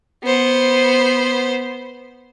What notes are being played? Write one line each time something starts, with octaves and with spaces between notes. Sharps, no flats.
B3 C5